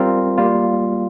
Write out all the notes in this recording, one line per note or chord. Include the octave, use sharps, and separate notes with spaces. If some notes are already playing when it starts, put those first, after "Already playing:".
Already playing: G3 C4 F4 A#4
G3 A#3 F4